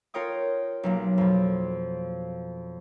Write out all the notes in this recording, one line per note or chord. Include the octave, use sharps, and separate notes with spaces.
F4 A#4 C#5 G5 D#6
B1 F#3 A#3
F2 B2